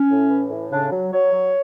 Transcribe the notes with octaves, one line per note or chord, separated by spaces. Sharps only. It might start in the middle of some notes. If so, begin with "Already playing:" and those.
Already playing: C#4
A2
E3
A2
C#3 D4
F#3
F#3 C#5
F#3